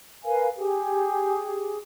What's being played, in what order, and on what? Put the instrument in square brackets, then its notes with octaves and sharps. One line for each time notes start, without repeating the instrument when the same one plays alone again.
[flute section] A#4 B4 F5 G#5
G4 G#4